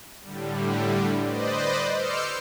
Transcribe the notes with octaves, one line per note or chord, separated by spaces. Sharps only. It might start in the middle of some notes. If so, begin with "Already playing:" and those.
A2 D3 G3
B4 C5 D5 D#5
C6 D6 E6 F6 G6 C#7